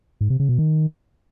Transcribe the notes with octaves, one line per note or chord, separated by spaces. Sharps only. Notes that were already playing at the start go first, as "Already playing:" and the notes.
G#2
C3
C#3
B2
D#3